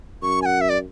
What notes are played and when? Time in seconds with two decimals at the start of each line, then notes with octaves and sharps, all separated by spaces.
0.22 F#2 C#6
0.42 G#5
0.46 F#5
0.61 E5
0.69 D5